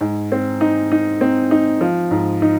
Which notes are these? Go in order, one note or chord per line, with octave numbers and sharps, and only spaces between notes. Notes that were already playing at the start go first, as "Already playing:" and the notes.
G#2
C4
D#4
D#4
C4
D#4
F3
G#2
D#4